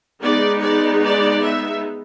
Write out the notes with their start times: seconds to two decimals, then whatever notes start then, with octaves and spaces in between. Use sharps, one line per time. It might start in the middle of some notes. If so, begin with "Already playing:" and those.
0.22 G#3 B3 D#4 D5
0.63 D5
1.02 D5
1.42 E5